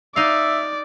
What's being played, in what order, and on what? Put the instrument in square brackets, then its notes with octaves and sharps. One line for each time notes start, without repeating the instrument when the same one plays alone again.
[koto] D#4 F5 [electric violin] D5 [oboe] E5